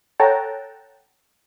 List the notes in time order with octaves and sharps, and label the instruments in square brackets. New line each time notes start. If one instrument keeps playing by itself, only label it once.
[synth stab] A4 C#5 F#5 G5 A5 A#5